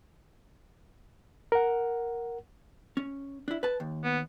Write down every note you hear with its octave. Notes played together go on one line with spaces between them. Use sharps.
A#4 F#5
C#4
D4 E4
B4 A5
D#2
B3